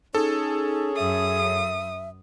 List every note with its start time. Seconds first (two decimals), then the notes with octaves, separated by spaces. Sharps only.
0.15 C#4 D#4 G#4 A4
0.96 F#2 E5 D#6